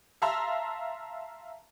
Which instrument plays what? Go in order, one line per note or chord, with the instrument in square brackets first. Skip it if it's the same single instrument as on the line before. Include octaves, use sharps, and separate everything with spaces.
[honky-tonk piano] E5 F5 A5 A#5 C6 E6